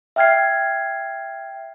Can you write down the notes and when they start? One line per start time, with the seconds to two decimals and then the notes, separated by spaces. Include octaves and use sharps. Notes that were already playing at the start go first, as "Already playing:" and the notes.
0.16 E5 G5 F6 G#6 C7